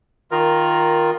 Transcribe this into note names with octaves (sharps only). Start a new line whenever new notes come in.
D#3 F4 A#4